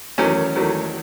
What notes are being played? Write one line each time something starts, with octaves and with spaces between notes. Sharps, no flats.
E2 D#3 F#3 A3 C#4
E2 D#3 F#3 A3